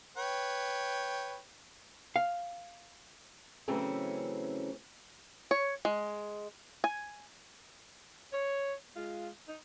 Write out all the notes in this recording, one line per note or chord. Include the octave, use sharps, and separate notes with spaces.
B4 C#5 G5
F5
C#3 E3 F#3 A3 C4 C#4
C#5
G#3
G#5
C#5
G#3 F4
D#4